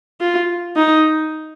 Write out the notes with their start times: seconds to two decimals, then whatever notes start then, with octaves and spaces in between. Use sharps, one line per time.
0.20 F4
0.77 D#4